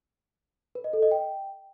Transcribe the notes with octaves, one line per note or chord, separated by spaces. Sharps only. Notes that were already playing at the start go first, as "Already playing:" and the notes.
B4
D#5
A4
D#5
G5